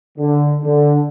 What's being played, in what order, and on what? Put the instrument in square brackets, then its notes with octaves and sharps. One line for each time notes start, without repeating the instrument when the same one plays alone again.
[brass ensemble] D3
D3